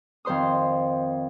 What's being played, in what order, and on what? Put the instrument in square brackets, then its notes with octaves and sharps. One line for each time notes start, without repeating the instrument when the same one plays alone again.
[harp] F2 D#3 C5 C6 D#6